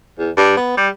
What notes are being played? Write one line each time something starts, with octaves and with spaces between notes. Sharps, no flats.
E2
G2
B3
G3